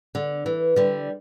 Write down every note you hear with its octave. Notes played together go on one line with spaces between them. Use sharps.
D3
E3
D3 G3